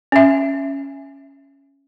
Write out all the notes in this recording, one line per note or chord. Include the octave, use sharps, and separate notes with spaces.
C#4 E5